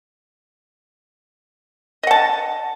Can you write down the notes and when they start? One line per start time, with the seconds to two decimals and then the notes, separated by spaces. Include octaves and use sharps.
2.03 D#5
2.07 F#5
2.11 A5